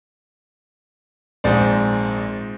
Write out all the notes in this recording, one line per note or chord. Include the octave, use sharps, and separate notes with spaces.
A#1 G#2 C4 D5